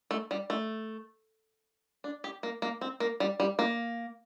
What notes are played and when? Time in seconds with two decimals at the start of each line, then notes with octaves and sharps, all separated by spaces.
0.11 A3
0.31 G3
0.50 A3
2.04 D4
2.24 G4
2.43 A#3
2.62 A#3
2.81 C4
3.00 A#3
3.20 G3
3.40 G3
3.59 A#3